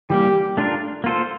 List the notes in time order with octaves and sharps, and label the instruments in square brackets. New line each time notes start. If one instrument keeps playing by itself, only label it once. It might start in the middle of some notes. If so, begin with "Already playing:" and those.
[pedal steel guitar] E3 G3 A#3 [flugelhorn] G4
[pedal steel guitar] A3 D4 F4 A#4
A#3 F4 A4 C5